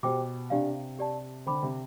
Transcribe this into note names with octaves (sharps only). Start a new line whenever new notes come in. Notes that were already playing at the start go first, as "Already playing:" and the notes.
B2 G4 C5 G5 D6
C3 D4 G4 D5 F5
G4 D5 A5
D3 C5 G5 B5 D6
C3